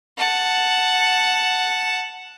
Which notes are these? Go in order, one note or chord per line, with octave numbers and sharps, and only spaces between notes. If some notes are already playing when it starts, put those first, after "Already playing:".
F#5 A5